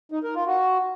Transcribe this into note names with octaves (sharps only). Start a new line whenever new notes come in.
D#4
A#4
F4
F#4